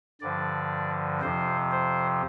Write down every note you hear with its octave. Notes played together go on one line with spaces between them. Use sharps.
G2 D3 F3 D5
F2 C3 F3 C5
C5